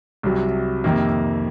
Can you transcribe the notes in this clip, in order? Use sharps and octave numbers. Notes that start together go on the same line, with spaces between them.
C2 C3 F#3
F2 C3 D#3 A#3